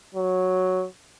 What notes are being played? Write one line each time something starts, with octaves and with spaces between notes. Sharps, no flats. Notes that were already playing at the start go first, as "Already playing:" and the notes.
F#3